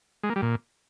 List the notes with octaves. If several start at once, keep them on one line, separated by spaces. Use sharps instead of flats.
G#3
A#3
G3
A#2